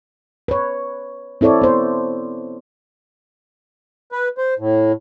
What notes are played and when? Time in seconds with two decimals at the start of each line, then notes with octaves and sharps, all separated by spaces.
0.48 B4 C#5
1.41 C4 E4 A4 C#5 D5
1.62 B3 C5
4.12 B4
4.38 C5
4.59 A2